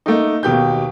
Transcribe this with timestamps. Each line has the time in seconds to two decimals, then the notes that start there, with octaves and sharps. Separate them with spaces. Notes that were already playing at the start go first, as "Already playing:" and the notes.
0.06 A3 A#3 D#4
0.43 D#2 B2 G4 G6